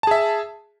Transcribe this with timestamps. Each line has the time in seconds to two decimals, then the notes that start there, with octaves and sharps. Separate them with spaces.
0.03 A5
0.07 G#4
0.11 E5